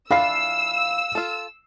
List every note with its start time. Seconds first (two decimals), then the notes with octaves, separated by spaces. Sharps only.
0.11 E3 D4 F4 F5 E6 C7
1.15 F4 A4